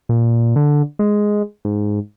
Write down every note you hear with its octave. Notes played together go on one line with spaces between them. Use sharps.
A#2
D3
G#3
G#2